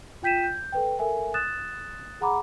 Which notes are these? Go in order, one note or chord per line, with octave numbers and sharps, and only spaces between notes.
F4 G5 G6 B6 D#7 E7
G6
A4 B4 G5
A4 A#4 E5 G#5
D#6 F#6 A6 E7
G#4 F#5 A#5 B5 D6